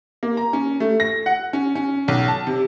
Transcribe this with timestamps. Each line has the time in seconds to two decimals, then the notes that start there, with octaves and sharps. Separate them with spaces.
0.23 A#3
0.37 A#5
0.53 C#4
0.80 A3
1.00 A#6
1.26 F#5
1.53 C#4
1.75 C#4
2.08 B1
2.28 A5
2.47 C3